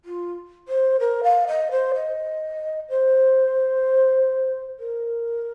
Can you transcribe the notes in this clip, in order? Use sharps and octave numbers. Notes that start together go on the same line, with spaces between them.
F4
C5
A#4
F5
D#5
C5
D#5
C5
A#4